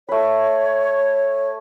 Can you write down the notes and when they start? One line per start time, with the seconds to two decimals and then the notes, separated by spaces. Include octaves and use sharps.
0.09 A3 B4 C#5